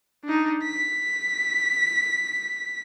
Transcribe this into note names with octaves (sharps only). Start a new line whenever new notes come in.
D4 D#4
B6